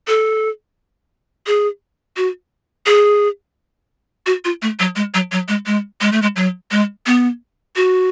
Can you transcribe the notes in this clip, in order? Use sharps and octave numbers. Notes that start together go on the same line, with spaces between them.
A4
G#4
F#4
G#4
F#4
F4
A3
F#3
G#3
F#3
F#3
G#3
G#3
G#3
A3
G#3
F#3
G#3
B3
F#4